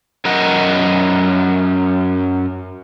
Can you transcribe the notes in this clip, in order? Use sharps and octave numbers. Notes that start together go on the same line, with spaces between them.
F#2 A#4 D#5 F#5